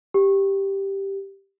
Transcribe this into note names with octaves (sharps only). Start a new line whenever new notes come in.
G4